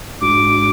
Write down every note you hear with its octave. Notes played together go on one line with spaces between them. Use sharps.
G#2 G#3 D4 F#4 D6